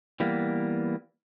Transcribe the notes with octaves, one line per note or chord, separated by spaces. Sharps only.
E3 G3 A#3 B3